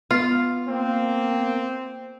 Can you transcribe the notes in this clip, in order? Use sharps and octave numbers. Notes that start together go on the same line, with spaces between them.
B3 F4
A#3 C4